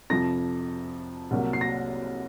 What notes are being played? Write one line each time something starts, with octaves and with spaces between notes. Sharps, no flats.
F2 C3 F3 A#6
C2 C3 F#3 A#3
C7
A#6